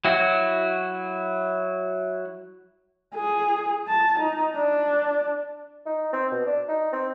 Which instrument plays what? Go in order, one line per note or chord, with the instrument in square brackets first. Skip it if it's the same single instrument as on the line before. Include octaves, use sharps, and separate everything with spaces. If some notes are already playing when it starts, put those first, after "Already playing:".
[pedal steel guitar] F#3 E4 F#4
[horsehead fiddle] G#4
A5
D#4
D4
[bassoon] D#4
C4
B2
D4
D#4
C4